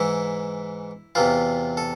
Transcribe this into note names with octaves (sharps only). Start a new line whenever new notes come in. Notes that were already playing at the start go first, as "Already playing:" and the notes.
Already playing: G#2 E3 E4
E2 C3 E3 F4
A4